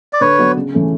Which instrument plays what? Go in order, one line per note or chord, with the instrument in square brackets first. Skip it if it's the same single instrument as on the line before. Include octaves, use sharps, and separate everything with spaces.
[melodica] D5
[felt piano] D3 [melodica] B4 C#5
[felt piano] F#3 B3 D4
C#3
E3 A3 C#4